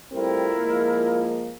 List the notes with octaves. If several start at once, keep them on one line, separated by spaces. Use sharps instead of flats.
G3 A3 C4 E4 F4 A#4
F3 G#3 A#3